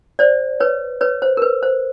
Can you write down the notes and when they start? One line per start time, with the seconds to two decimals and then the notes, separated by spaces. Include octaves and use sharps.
0.19 C5 D5
0.60 B4 C#5
1.01 B4 C#5
1.22 C5
1.37 A#4
1.42 B4
1.63 C5